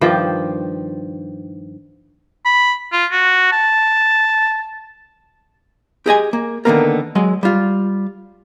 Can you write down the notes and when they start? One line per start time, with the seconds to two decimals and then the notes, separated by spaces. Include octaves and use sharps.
0.01 G2 D#3 F3 G4
2.45 B5
2.92 F4
3.11 F#4
3.52 A5
6.06 G4 G#4 D#5 G#5
6.33 A#3
6.65 D3 D#3 F3 A#3 B3 A#4
7.15 F#3 G#3 D#5
7.43 G3 F4